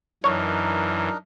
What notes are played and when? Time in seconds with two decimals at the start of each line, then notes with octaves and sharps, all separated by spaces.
0.24 F#2 E3 D4 D#4 A#4 C#5